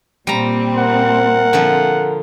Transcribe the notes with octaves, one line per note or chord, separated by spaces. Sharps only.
A#2 G3 C4 A#5
A#4 F#5
D3 F3